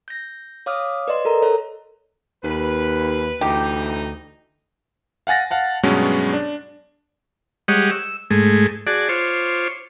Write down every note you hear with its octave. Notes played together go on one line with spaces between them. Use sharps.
G6 A#6
C#5 F5 D6 D#6 F6
B4 D5 D#5 C6
A4 A#4 A#5
A4 C5 C#5
D#2 B4
D2 E3 D#4 G4
F5 F#5 G#5 A6 A#6
F5 F#5 A5
G2 B2 F#3 G#3 B3 C#4
D4
G3 G#3 G4 C#5 D#5 F#5
E6
G#2 G#3 A3
F#4 G#4 D5 A5
F4 C5 C#5 D6